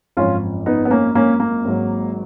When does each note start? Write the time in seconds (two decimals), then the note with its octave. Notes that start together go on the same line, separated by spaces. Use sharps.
0.17 G#1 F#2 F3 C#4 F4
0.66 B3 D#4
0.85 B3
0.90 A#3 C#4
1.15 A#3 C#4
1.40 A#3
1.65 G#1 G#2 F#3